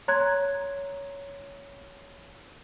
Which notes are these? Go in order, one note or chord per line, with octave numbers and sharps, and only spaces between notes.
C#5 A#5 C6 F#6 G#6